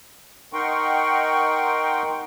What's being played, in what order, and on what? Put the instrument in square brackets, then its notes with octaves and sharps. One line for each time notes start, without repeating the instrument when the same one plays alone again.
[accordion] D#4 A#4 F#5 G5 C6 C#6